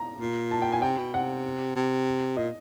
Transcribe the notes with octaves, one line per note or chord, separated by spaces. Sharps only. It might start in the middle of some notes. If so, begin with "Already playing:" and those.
Already playing: A#5
A#2
A5
G5
G#5
C3 G5
B2
C3 F#5
C3
A#2 D#5